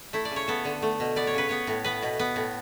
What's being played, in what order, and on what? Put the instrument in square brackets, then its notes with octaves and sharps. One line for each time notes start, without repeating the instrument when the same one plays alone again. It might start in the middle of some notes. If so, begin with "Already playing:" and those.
[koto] A3 E4
D5
C#3
C#5
B3 A4
D3
A3
B2
B3 D5
C#5
C#3 B4
B3 C#5
A2
B3 B4
B2
B3
A2